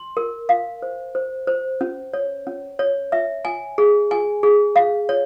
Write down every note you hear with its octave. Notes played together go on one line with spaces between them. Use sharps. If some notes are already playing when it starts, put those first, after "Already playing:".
Already playing: C6
A#4
F5
C5
C5
C5
C#4
C#5
C#4
C#5
E5
G#5
G#4
G#5
G#4
F5
C#5